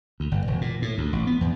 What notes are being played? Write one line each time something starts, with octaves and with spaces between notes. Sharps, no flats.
D2
G1
E1
A#2
A2
D2
A1
B3
E2